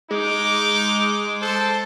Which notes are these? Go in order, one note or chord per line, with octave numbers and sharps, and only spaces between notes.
G#3 D#4 D6
A4 C5